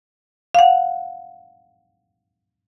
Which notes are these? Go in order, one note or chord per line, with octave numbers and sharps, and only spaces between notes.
F5 F#5